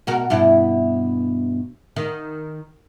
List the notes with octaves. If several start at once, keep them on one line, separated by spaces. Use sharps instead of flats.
B2 F#4 A#4
G2 B2 E4
D#3